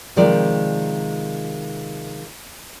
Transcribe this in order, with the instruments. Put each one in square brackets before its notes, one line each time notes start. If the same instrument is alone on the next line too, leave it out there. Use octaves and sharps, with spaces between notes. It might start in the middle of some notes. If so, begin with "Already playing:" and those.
[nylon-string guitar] C3 D#3 F3 G#3 A#4 D5